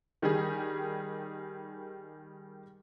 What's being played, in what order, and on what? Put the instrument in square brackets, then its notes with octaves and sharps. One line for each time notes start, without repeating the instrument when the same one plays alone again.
[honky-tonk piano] D#3 G3 G#4